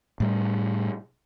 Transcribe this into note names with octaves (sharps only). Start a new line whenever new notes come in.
A2 G3